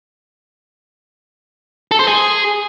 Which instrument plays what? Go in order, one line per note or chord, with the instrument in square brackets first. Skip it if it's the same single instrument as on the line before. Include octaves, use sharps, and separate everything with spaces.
[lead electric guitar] A4
C5
G#4